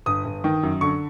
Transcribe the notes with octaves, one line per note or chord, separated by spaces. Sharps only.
G1 D#6
G1
D#3
F#2
D3 C#6